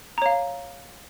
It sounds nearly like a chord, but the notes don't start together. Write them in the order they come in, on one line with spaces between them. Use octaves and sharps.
A#5 C#5 F5